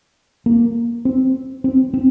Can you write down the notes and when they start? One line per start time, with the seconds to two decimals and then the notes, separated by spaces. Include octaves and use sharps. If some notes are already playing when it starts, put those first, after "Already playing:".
0.46 A#3
1.05 C4
1.64 C4
1.94 C4